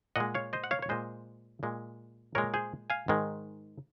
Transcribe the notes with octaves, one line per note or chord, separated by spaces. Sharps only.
A#2 G#3 D#5 F#5
C#5 F5
C5 D#5
F#5
C#5 F5
C#5
A#2 G#3 C5 D#5
A#2 G#3
A#2 G#3 A#4 C#5
G#4 C5
F5 G#5
G#2 D#3 G#3